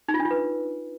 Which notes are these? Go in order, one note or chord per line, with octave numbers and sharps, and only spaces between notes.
D#4
F4
D4
F4
B4